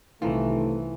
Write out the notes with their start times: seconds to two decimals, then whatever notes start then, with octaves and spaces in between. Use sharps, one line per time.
0.22 C2 D#3 E3 A3 C4 F4